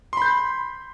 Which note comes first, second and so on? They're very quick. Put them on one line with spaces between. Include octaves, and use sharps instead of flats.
C6 B5 G6